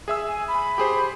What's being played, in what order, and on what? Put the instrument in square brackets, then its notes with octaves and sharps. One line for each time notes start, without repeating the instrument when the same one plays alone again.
[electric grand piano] G#4 E5 E6
[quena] G#5
B5
[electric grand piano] G4 G#4 C5